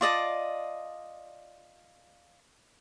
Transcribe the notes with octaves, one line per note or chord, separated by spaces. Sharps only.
F4 D5 D#5 A5